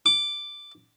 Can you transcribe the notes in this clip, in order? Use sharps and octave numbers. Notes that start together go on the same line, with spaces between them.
D6